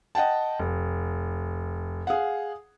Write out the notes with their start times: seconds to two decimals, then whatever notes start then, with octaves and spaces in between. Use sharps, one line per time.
0.15 D#5 F#5 G5 A5
0.59 F1
2.07 G#4 F5 F#5